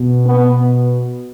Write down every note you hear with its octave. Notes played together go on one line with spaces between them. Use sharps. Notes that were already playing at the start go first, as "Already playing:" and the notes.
Already playing: B2
B3